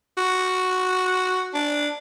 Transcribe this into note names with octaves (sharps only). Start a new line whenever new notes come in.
F#4
D4